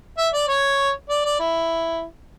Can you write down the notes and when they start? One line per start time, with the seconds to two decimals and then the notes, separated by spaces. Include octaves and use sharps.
0.18 E5
0.33 D5
0.48 C#5
1.09 D5
1.25 D5
1.39 E4